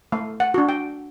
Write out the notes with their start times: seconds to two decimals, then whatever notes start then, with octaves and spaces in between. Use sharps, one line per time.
0.12 A3 F5
0.40 F#5
0.54 D4 F#4
0.69 G5